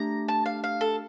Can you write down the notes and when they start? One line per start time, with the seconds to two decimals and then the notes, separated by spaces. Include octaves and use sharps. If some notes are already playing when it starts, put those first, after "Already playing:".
Already playing: A3 D4 G4 A#5
0.28 A5
0.46 F5
0.64 F5
0.81 A4